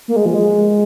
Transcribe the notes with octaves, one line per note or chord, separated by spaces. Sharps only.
A#3
G#3
F3
G#3